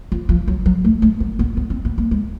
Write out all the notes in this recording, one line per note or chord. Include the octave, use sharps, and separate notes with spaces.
F3
F3
F#3
F#3
A3
A3
B3
B3
B3
C4
B3
A#3
G#3